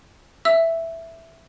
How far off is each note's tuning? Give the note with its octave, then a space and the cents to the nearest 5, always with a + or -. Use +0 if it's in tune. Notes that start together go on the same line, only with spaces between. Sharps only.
E5 +0 E6 +0